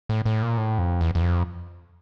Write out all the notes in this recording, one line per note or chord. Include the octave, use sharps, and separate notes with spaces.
A2
A2
A#2
A2
F2
E2
E2
F2